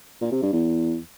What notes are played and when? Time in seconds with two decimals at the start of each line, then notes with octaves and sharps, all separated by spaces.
0.21 A#2
0.32 C3
0.42 G2
0.53 E2